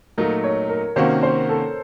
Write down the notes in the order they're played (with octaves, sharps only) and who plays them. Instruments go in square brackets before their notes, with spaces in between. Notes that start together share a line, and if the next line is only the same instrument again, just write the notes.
[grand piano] A#2 F#3 A3 D#4 [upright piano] A#4
[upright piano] C#5
A#4
[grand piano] C3 D#3 A#3 C#4 F#4 [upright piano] C5
[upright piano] C5
A4